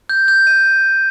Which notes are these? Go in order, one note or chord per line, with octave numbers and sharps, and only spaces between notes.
G6
G6
D#7